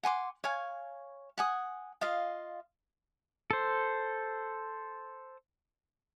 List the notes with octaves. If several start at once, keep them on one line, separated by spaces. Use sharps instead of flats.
F#5 G#5 C6 D6
C#5 F5 G#5
F#5 G#5 D#6
F4 D#5 F5
A4 C5